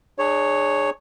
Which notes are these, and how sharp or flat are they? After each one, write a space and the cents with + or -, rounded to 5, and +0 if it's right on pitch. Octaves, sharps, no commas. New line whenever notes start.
D4 +35 G#4 +0 C#5 +0